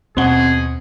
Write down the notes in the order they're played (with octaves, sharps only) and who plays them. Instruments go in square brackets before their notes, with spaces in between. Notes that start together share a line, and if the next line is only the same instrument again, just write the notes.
[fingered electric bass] D#2 C#4 [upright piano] B2 F#5 G7 [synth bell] C4 [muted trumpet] G#4